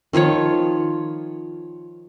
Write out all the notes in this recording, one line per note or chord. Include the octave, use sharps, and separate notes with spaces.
D#3 F3 F4 C#5